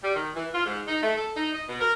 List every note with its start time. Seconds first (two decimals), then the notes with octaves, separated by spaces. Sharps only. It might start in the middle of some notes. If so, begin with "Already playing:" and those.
0.03 G3
0.15 D#3
0.35 E3
0.54 F4
0.65 G#2
0.87 D#4
1.03 A3
1.16 A4
1.36 D#4
1.54 D#5
1.68 B2
1.80 A#4